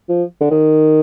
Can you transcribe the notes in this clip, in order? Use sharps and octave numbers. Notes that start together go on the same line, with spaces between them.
F3
D3
D#3